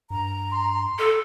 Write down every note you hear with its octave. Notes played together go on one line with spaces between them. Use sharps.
G2 A#5
C6
A4